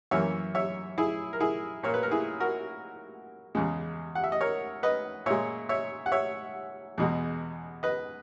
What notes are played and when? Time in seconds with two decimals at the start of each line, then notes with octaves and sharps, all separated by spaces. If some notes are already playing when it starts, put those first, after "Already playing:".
0.11 F#2 E3 A#3 C#5 E5
0.55 C#5 E5
0.98 E4 G#4
1.33 A#4
1.40 E4 G#4
1.83 A#2 A#3 C#5
1.94 B4
2.03 A#4
2.11 E4 G#4
2.40 F#4 A#4
3.55 E2 C#3 G#3
4.15 F#5
4.24 E5
4.32 D#5
4.41 A#4 C#5
4.83 B4 D#5
5.26 A#2 G#3 C#5 E5
5.69 C#5 E5
6.06 F#5
6.12 C#5 E5
6.98 E2 B2 G#3
7.83 B4 D#5